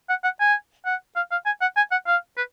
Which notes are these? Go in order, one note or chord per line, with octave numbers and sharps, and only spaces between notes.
F#5
F#5
G#5
F#5
F5
F5
G#5
F#5
G#5
F#5
F5
B4